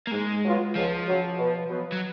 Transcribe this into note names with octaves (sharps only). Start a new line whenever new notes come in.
A#3
G#2 G#3
F#3 B3 F4
C#2 F3
C#3 F#3
B2
F#3 B3
F#3